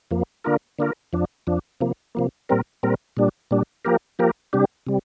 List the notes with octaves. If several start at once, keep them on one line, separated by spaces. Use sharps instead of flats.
F2 F3 A#3
D3 A#3 D4 F4 A#4
D3 A#3 D4 F4 A#4
F2 F3 D4
F2 F3 D4
C3 F3 A#3
C3 F3 A#3
A#2 G3 C4 A#4
A#2 G3 C4 A#4
A#2 G3 D4
A#2 G3 D4
F3 A#3 G4 A#4
F3 A#3 G4 A#4
C3 G3 D4 G4
C3 G3